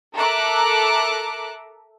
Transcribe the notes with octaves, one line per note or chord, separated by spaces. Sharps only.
A4 A#4 E5 A#5 D6 F#6